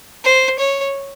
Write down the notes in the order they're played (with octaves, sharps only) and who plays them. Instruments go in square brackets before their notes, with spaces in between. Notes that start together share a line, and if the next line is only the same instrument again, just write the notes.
[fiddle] C5
C#5